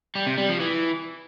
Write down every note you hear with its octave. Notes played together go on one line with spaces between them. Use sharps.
G3
C3
G3
F3
E3